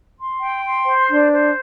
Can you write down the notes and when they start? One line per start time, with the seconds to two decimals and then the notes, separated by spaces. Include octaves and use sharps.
0.17 C6
0.40 G5
0.63 C6
0.85 C5
1.09 D4
1.31 C5